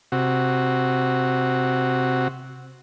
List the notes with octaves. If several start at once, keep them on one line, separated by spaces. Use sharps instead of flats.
C3 F#4